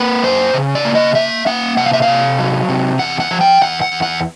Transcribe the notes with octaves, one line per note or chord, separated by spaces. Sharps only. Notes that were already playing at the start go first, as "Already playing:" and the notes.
Already playing: A#3 B4
F#2 C5
C#3
D5
A#3
D#5
A#3 E5
A#3 F#5
C3 F#5
F5
E5
F5
C3
F#3
C3
E2 F#5
F#5
F3
G5
E2 F#5
F#5
E2
F#5